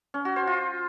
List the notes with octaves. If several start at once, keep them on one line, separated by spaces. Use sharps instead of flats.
C#4
F#4
C5
F4